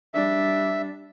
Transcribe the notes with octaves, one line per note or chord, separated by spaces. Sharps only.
G3 D4 E5